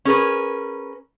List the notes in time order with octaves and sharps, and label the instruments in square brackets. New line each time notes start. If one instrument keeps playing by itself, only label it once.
[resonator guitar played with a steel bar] C#4 G#4 A#4 B4